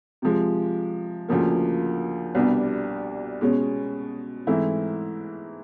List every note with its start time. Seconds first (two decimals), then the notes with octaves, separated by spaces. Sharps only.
0.22 C3 F3 G#3
1.29 D2 C#3 F3 A#3
2.35 C2 B2 G3 B3 D4
3.41 B2 G#3 C#4
4.47 G#2 E3 A3 C4 E4